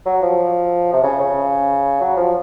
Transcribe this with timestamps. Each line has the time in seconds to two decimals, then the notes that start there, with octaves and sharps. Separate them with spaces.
0.06 F#3
0.22 F3
0.93 C3
1.03 C#3
1.20 C#3
2.01 F#3
2.17 F3